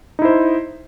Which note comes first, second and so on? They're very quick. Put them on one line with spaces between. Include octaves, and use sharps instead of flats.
D#4 E4 C5